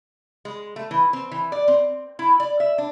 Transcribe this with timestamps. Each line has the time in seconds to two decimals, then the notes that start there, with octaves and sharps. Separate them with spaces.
0.45 G#3
0.76 A3
0.91 E3
1.13 C4
1.31 E3
1.52 D5
1.68 C4
2.19 E4
2.40 D5
2.60 E5
2.78 D4